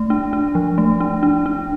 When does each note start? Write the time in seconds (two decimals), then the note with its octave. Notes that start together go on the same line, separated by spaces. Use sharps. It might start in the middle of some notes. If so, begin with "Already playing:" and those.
Already playing: A3
0.10 D4
0.33 D4
0.55 F3
0.78 A3
1.00 D4
1.23 D4
1.46 D4